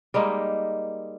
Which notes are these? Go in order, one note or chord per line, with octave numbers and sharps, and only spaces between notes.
G3 G#3 A#3 D#4